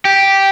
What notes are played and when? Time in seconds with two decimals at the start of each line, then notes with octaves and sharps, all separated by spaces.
0.05 G4